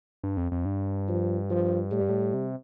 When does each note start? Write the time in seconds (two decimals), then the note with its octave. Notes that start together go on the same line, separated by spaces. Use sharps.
0.23 G2
0.37 F2
0.52 F2
0.65 G2
1.08 F3
1.50 F3
1.92 A2 G3
2.01 G2
2.09 A2
2.34 C3